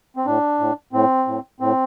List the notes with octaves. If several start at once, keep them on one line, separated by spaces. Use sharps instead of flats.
C4
A2 D4
A2
A2 C4
A2
A2 C4